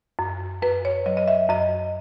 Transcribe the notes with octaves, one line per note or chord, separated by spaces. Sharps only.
F#2
F#2 B4
C#5
F#3 D#5
D#5
E5
F#2 D#5